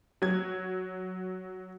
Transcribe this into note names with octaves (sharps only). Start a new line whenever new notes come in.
F#3 G#6